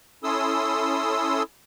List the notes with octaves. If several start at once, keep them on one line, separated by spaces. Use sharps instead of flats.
C#4 E4 A4 C6 D#6 E6